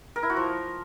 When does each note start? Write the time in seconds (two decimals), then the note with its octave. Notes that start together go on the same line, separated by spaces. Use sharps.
0.16 A#4
0.23 E4
0.30 F#4
0.37 F3